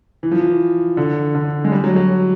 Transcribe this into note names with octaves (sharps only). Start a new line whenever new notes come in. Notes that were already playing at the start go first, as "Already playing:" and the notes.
E3
F3
E3
D3
D3
G#3
G3
F#3
F#3